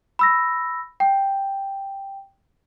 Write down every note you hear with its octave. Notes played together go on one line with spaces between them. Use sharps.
B5 E6 A#6
G5